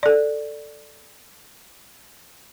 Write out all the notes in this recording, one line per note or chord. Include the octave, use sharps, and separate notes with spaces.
A4 D5